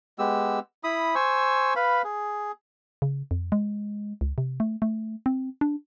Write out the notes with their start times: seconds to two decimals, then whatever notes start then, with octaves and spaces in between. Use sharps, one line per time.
0.19 G#3 B3 G4 E6
0.84 E4 B5 D#6
1.15 C5 G#5 C#6 E6
1.76 B4 F5 B5
2.04 G#4
3.02 C#3
3.31 F2
3.52 G#3
4.21 C#2
4.38 C3
4.60 A3
4.82 A3
5.26 C4
5.61 D4